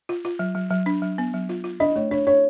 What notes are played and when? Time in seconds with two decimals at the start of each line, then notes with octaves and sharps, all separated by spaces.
0.09 F4
0.25 F4
0.39 F#3
0.55 F#3
0.70 F#3
0.86 D4
1.02 F#3
1.18 B3
1.34 F#3
1.49 F4
1.64 F4
1.80 D4 D#5
1.96 A3 C#5
2.11 D4 C#5
2.27 D4 C#5